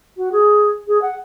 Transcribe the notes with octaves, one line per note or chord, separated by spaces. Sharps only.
F#4
G#4
G#4
F#5